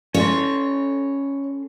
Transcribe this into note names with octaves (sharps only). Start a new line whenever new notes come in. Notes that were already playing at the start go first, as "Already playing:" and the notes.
C#4 A4 C#5 C6